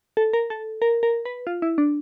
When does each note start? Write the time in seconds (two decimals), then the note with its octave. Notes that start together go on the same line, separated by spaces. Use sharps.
0.17 A4
0.33 A#4
0.50 A4
0.82 A#4
1.03 A#4
1.25 B4
1.47 F4
1.62 E4
1.78 D4